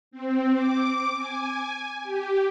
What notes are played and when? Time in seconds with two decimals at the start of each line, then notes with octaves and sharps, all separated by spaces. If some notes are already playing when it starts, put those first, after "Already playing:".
0.11 C4
0.52 D6
1.16 G#5
2.03 G4